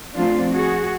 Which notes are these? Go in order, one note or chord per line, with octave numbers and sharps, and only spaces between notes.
F3 A3 C4 D4 F4
F#4 G#4